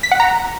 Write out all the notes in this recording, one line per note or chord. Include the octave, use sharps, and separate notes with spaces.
B6
F#5
A#5